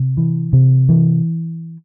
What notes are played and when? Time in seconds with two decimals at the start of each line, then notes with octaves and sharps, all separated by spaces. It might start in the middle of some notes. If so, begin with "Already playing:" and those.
Already playing: C3
0.17 E3
0.53 C3
0.89 E3